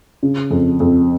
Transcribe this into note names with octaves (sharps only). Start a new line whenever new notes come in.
C#3
F2
F2